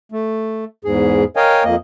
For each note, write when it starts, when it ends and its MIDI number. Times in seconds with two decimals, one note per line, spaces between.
0.12 0.65 57
0.85 1.24 40
0.85 1.24 44
0.85 1.24 68
1.36 1.64 70
1.36 1.64 73
1.36 1.64 75
1.36 1.64 77
1.36 1.64 79
1.36 1.64 80
1.64 1.76 41
1.64 1.76 58
1.64 1.76 75